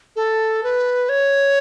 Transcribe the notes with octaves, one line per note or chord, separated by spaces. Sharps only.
A4
B4
C#5